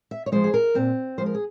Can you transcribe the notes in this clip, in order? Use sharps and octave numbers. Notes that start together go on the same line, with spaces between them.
E5
C#5
F3 G#3 C5
G#4
A#4
A#2 C4
F3 G#3 C5
A#4
G#4